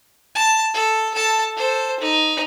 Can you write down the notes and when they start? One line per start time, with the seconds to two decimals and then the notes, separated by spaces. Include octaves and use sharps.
0.35 A5
0.74 A4
1.14 A4 A5
1.57 A4 C5
2.00 D#4